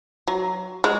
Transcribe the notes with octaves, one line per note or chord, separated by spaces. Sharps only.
F#3
G#3